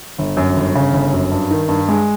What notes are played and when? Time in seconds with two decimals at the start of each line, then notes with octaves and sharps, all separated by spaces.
0.18 G1
0.37 F#2
0.56 G1
0.76 C#3
0.93 G1
1.13 F#2
1.32 G2
1.51 D#3
1.69 G2
1.89 G#3